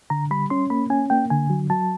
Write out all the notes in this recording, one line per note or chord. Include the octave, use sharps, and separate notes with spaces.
D3 A#5
G3 B5
C#4 C6
A#3 B5
C#4 G#5
A#3 G5
D3 G#5
F#3
F#3 A5